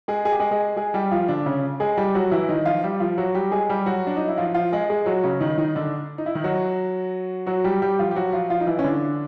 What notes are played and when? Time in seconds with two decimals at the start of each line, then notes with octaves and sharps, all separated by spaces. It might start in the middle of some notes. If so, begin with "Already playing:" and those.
0.08 G#3 G#4
0.25 G#4
0.32 G4
0.39 G#3 G#4
0.51 G#3 G#4
0.77 G#3 G#4
0.94 G3 G4
1.11 F3 F4
1.28 D3 D4
1.46 C#3 C#4
1.80 G#3 G#4
1.97 G3 G4
2.15 F#3 F#4
2.32 E3 E4
2.49 D#3 D#4
2.65 F3 F4
2.84 G3 G4
3.00 F3 F4
3.18 F#3 F#4
3.35 G3 G4
3.51 G#3 G#4
3.69 G3 G4
3.86 F#3 F#4
4.07 D4
4.16 D#4
4.28 E4
4.38 F3 F4
4.54 F3 F4
4.72 G#3 G#4
4.90 G#3 G#4
5.06 F#3 F#4
5.24 C#3 C#4
5.41 D#3 D#4
5.58 D#3 D#4
5.75 D3 D4
6.18 D#4
6.26 E4
6.35 D#3 D#4
6.44 F#3 F#4
7.46 F#3 F#4
7.64 G3 G4
7.82 G3 G4
7.99 F3 F4
8.11 G4
8.16 F#3 F#4
8.32 F3 F4
8.50 F3 F4
8.60 D#4
8.67 E3 E4
8.79 C#4
8.84 D3 D4